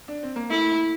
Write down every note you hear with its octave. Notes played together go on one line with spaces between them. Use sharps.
D4
C4
A#3
A3 E4